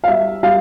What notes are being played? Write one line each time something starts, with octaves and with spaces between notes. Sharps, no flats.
F5
G3 E5
G3 F5